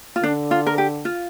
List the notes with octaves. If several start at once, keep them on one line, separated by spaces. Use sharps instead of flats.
F4
D3 D4
F4
A#4
G4
F4